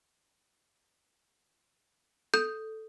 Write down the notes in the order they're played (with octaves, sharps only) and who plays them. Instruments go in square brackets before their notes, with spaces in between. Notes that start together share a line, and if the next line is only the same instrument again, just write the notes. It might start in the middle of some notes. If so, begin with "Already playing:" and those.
[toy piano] A4 [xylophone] G6